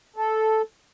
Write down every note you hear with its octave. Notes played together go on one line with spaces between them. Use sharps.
A4